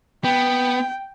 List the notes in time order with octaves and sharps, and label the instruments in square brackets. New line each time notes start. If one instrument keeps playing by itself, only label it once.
[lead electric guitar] B3 [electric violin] G5